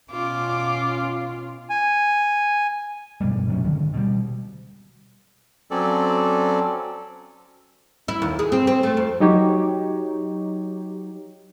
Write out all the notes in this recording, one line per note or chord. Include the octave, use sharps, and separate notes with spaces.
B2 C#4 F4 D6
G#5
G2 B2 G3
D2 C3 F#3 C#4
G#1 D3 D#3 G#3
B2 G3
F#3 C4 C#4 A4 D5
E4
D#2
G#4
C4
C4
A3
F2
F#3 D#4 G4 C#5